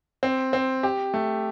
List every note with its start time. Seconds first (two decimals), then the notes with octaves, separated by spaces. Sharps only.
0.23 C4
0.53 C4
0.83 G4
1.14 A3